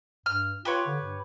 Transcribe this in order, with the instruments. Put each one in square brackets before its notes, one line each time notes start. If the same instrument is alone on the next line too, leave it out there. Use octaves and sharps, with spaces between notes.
[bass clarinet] G2 [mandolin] F6
[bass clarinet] F4 [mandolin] G4 B4 C#5
[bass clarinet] D3
G2